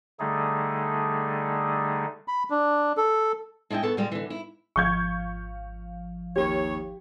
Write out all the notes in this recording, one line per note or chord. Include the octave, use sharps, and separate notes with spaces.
D3 G3 A3 D#4 G#4 A4
B5
D4
A4
G#3 D4 E4 D#5 G5
B3 A4 C#5
A#2 C#3 G3 G#3
D3 E3
E4
G#1 F3 F5 C#6 G6 G#6
D#2 G4 C#5